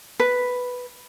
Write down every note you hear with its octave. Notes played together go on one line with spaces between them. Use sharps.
B4